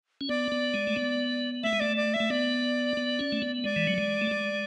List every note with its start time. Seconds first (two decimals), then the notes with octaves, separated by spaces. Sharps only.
0.21 C#4
0.29 B3 D5
0.52 B3
0.74 G#3
0.87 A3
0.96 B3
1.63 A3 E5
1.73 G#3
1.80 A3 D5
1.97 D5
2.14 E5
2.20 A3
2.30 B3 D5
2.97 B3
3.19 C#4
3.32 A3
3.42 B3
3.64 G#3 D5
3.76 E3
3.87 F#3
3.98 G#3
4.21 A3
4.31 G#3